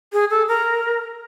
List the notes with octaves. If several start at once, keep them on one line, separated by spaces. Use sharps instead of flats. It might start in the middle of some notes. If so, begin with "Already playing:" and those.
G#4
A4
A#4